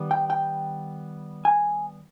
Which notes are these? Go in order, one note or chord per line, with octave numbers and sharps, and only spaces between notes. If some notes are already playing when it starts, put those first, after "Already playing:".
Already playing: D#3 G3 B3
G5
G5
G#5